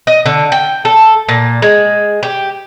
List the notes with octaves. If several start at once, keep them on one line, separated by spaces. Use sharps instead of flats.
D#5
D3
G5
A4
A#2
G#3
G4